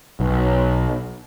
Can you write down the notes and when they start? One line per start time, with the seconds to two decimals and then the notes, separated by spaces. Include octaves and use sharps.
0.20 B1